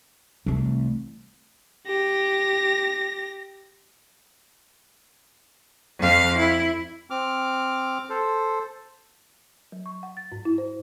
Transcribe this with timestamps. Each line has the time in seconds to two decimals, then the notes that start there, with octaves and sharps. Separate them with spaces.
0.46 C2 E3 A3
1.87 G4 A#6
5.99 F2 F5
6.39 E4
7.10 C4 D6 F6
8.10 A4 C5
9.72 F#3
9.86 C#6
10.03 F#5
10.17 A6
10.32 G#2
10.45 E4
10.58 C5